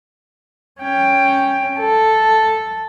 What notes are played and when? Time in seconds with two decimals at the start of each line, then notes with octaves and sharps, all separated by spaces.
0.81 C#4 G5
1.80 A4